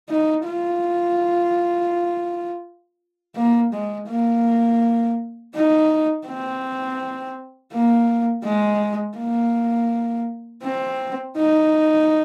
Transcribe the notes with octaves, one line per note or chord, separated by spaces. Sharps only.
D#4
F4
A#3
G#3
A#3
D#4
C4
A#3
G#3
A#3
C4
D#4